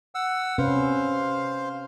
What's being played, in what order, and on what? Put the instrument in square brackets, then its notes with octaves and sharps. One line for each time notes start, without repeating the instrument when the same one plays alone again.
[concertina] F#5 E6
[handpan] C3 C#4 B4 [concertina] C5 F5